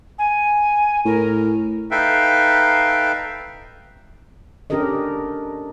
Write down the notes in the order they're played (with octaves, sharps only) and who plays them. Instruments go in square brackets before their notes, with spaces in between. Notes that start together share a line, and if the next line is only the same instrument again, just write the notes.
[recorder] G#5
[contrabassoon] A2 [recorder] A#4
[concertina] D#4 A4 B4 E5 F5 G5
[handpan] C#4 D4 G4 A4 A#4 D#5